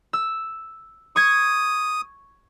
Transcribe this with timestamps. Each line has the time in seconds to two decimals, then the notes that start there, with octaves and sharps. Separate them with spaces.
0.13 E6
1.16 C#6 D#6 G#6